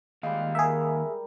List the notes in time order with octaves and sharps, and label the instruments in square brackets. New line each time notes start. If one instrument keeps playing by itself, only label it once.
[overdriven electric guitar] D#2 F5 [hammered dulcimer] G3 G#3
[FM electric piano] G#4 E5 [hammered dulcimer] A#4